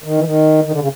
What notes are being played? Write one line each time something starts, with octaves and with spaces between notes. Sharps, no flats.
D#3
E3
D#3
D#3
D3
C#3